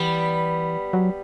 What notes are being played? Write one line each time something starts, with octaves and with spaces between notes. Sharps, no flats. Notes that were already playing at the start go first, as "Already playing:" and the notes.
Already playing: E3 G3 B3
F#3